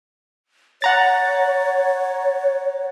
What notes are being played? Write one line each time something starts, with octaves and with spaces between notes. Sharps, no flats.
C#5 F#5 A#5 A6